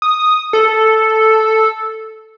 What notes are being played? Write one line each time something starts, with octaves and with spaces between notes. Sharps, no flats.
D#6
A4